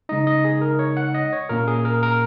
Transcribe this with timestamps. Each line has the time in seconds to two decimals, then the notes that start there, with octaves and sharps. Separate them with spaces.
0.09 C#3 G#3 D#4 D#5
0.27 D#5
0.45 G#4
0.61 A#4
0.79 C#5
0.97 F#5
1.14 D#5
1.33 C#5
1.49 A#2 A#3 C#4 A#4
1.68 G#4
1.85 A#4
2.03 A#4